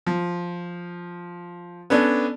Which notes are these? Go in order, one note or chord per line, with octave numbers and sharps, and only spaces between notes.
F3
B3 C#4 D4 A4